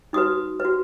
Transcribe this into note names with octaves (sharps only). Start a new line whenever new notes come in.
D#4 F#4 B4 D#6
B4
F#4